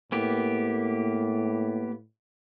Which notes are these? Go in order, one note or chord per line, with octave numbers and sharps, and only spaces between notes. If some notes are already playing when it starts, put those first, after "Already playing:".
A2 A#3 B3 G4